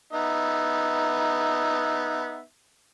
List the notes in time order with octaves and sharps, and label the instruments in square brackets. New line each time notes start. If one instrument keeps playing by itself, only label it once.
[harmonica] B3 D#4 E5